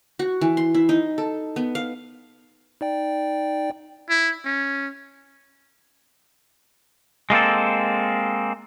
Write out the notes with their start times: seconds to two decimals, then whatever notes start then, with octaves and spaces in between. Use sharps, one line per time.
0.19 F#4
0.41 E3
0.57 C6
0.75 E4
0.89 D#4
1.18 A4
1.56 B3
1.75 F5
2.81 D#4 D5 G5
4.10 E4
4.45 C#4
7.30 G#3 A#3 C4 A4